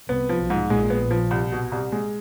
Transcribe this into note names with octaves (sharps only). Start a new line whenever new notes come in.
C2 C3 B3
F3
B1 B2
G#2
A#1 A#2 G#3
B3
F3
C2
B2
C2
G#3